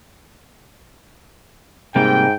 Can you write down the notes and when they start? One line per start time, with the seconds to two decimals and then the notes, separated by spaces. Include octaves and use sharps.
1.96 G#2 C3 G3 A#3 G5